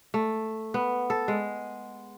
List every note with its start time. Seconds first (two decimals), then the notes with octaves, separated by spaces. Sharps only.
0.14 A3
0.74 B3
1.10 A4
1.28 G#3